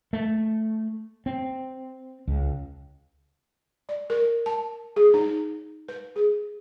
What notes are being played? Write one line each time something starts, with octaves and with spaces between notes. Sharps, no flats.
A3
C4
C#2
D5
A#4
A5
G#4
D#4
B4
G#4